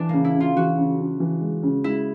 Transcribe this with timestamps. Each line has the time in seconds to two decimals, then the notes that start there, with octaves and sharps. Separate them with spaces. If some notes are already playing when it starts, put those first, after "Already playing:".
Already playing: E3 D4
0.09 C#3 A#3
0.24 E4
0.35 C#3
0.40 F4
0.56 E3 F#4
0.78 C#3
0.99 C#3
1.20 E3
1.41 G#3
1.63 C#3
1.84 G#3 E4